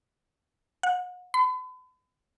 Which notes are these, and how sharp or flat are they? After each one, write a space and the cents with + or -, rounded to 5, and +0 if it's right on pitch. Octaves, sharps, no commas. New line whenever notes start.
F#5 -40
B5 +40